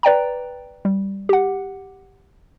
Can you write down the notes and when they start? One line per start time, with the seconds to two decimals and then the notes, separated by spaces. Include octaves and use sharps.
0.03 B4 D5 G5 A#5
0.85 G3
1.29 G4 F#5